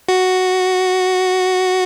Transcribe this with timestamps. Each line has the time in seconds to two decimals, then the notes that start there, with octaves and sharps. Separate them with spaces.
0.09 F#4